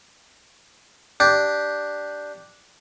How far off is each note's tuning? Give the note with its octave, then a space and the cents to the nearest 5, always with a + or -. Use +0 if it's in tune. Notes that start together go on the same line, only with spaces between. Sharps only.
D4 +0 G4 +0